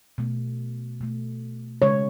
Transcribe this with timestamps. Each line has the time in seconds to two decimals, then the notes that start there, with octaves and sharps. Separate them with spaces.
0.18 B2 A3
1.01 B2 A3
1.82 C#3 G#3 C#5